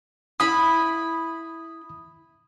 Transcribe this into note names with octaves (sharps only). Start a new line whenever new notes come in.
E4 B5 D#6